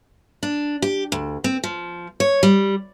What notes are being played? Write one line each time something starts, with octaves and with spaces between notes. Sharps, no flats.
D4
G4
D2
C4
F3
C#5
G3